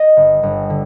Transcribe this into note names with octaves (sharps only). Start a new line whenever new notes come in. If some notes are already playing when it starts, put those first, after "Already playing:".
Already playing: D#5
G1
G1
D3